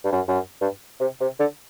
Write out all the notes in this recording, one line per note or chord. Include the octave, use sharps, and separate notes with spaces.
G2
F#2
F#2
G2
C3
C3
D3